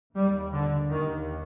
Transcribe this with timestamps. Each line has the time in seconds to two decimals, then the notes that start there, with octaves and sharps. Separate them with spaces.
0.16 D#2 G3
0.53 D3
0.90 D#2 D#3